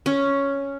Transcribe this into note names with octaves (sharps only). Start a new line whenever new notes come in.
C#4